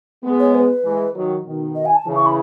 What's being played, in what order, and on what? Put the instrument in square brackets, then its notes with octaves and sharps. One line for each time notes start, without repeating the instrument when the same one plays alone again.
[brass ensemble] G#3 B3
[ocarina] C#5
B4
[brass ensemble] E3 G#3
D#3 F#3
B2 D#3
[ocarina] D#5
G#5
A5
[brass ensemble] C#3 E3
[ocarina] C#6
B5